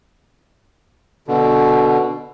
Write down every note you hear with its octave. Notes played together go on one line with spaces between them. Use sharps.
B2 D3